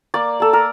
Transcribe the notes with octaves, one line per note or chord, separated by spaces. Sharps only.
A#3 D5
A#3 A4
A#4